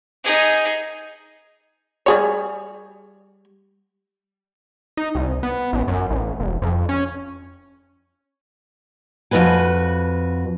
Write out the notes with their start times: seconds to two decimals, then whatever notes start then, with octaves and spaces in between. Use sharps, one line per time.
0.24 D#4 G#4
2.06 G3 G#4 C#5
4.97 D#4
5.15 C2
5.43 B3
5.73 A1
5.88 F#2
6.10 A1
6.40 E1
6.62 F2
6.89 C#4
9.31 F2 A#2 F#4 B4 G#5